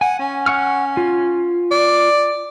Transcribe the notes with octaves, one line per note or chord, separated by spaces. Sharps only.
F#5 G#5
C#4
F#5 C#6 F6
F4
D5